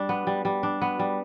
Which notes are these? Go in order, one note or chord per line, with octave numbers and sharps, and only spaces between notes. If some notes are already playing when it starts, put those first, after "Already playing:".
Already playing: G3 D4
B3
G3
G3
D4
B3
G3